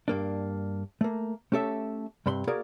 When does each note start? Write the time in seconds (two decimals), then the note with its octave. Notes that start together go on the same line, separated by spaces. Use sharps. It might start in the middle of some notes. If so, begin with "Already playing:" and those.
0.08 G2 A#3 D4
1.01 A3 A#3
1.52 A3 C#4 G4 A4 E5
2.26 G2 C3 B5 C6
2.47 A#3 F#4 G#4 A#4 D5